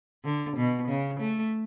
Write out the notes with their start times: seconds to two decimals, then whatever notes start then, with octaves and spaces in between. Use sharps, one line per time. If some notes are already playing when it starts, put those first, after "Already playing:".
0.25 D3
0.57 B2
0.88 C#3
1.20 A3